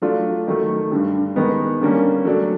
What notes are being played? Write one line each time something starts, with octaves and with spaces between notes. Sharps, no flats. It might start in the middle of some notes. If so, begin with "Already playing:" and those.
F#3 A3 D4 F4
D#3 F#3 A3
G2 D3 G3
D#3 G#3 B3
D3 G3 A#3 C#4
F#3 A3 D4